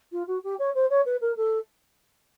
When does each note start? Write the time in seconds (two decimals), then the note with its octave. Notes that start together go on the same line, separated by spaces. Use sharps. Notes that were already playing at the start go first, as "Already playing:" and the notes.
0.12 F4
0.27 F#4
0.43 G4
0.59 C#5
0.75 C5
0.90 C#5
1.05 B4
1.21 A#4
1.36 A4